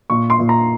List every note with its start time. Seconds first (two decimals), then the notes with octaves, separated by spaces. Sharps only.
0.10 A#2 C#6
0.30 C6
0.40 A#2
0.49 A#5